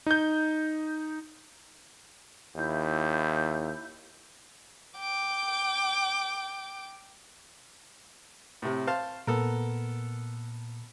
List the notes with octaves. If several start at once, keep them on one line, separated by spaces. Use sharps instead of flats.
D#4 G6
D#2 E4 G6
G5 D6
A2 C3
C5 F5 A5
A#2 B3 A4 A#4